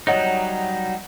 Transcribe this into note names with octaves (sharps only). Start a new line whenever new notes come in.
F#3 G3 D#4 C#5 D#5 F#5